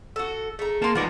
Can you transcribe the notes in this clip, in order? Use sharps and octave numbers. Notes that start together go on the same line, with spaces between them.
F#4 A4
A3 G#4 A#5
A#3 A5 C6
F3 B3 D#4 A#4 D5 F#5